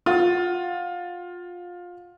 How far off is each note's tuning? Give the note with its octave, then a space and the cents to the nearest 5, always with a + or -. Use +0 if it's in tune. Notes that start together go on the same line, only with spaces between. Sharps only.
F4 +20 F#5 +20